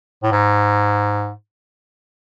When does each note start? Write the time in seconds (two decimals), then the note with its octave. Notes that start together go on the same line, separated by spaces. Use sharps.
0.23 A2
0.32 G#2